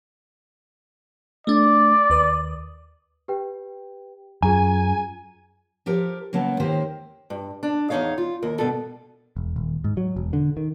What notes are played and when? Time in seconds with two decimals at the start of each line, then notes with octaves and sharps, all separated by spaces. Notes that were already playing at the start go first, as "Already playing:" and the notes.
1.47 A3 D4 D5
2.10 D#2 B4 D#6
3.28 G4 B4 G5
4.43 F#2 F4 G#4 G#5 A#5
5.86 F3 G4 A4 A#4
6.33 C#3 F#3 A#3 B3 A5
6.60 D#2 D#3 A#3 G4 C5
7.30 G2
7.63 D4
7.90 E2 F3 D#4 C#5 F5
8.18 F4
8.42 D#2 A#4
8.59 G2 B2 A4
9.36 E1
9.56 D#1
9.84 G#2
9.97 F#3
10.16 E1
10.33 D3
10.57 D#3